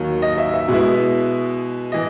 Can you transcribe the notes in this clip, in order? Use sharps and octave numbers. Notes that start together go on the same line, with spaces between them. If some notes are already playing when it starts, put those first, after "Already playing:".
Already playing: D#2 D#3 F#3
D#5
E5
E5
B2 G#3 B3 E4
E3 D#5